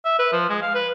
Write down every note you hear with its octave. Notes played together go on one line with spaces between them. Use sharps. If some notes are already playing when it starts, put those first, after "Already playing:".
E5
B4
F3
G#3
F5
B4